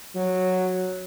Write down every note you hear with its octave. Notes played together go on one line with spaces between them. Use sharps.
F#3